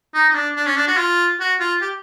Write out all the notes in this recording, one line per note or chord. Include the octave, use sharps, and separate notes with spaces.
D#4
D#4
D4
D4
C#4
D4
F#4
F4
F#4
F4
G4